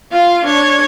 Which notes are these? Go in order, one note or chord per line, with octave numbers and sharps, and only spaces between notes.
F4 F5
D4 C#5